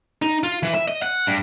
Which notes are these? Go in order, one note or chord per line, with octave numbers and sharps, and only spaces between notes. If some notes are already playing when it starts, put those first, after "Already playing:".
D#4
F4
E3
E5
D#5
F#5
G2